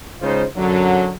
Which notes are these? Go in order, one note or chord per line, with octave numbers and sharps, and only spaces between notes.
C#3 G#3 D#4 F4 C5
F#2 D3 F#3